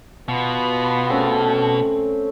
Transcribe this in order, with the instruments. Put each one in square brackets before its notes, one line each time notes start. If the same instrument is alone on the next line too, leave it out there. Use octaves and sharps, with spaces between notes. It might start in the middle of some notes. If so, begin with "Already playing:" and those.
[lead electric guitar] B2 [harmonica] B3 F4
[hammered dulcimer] A3 C4 C#4